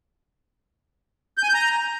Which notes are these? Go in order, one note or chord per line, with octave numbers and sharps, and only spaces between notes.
G6
G#5
G6
A#5